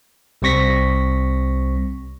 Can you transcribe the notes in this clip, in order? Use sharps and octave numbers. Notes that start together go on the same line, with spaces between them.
C2 G3 C4 C#6 A#6 B6